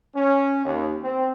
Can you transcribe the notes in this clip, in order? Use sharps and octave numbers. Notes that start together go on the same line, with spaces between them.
C#4
D#2
C4